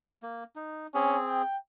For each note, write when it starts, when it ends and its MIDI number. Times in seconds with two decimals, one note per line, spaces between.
0.23 0.44 58
0.56 0.87 63
0.95 1.42 60
0.95 1.18 61
0.95 1.42 68
1.27 1.58 79